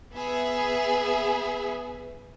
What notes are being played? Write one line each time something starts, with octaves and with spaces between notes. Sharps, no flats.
B3 G#4 E5